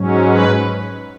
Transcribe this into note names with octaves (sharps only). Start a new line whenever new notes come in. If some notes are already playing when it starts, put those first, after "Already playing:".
Already playing: G#2 F#3 C#4
B4